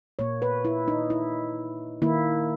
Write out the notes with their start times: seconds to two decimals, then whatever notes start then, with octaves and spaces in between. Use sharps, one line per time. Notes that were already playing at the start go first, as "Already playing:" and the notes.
0.19 A#2 A#3 C#5
0.42 B4
0.65 E4
0.88 D#4
1.10 E4
2.02 D#3 A#3 E4